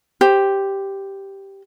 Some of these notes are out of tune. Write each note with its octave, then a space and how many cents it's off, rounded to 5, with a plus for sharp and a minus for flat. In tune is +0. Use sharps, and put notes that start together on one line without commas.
G4 +0 C5 +0